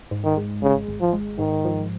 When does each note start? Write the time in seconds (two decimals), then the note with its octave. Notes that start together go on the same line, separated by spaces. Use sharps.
0.11 G#2
0.24 D#3
0.37 G#3
0.62 G#1 C#3
0.88 G#1
1.01 F3
1.13 G#3
1.39 G#2 D#3
1.65 F3